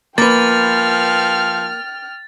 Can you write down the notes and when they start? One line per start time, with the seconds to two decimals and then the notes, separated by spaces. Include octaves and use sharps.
0.18 F3 A#3 B4 G5 F6 A6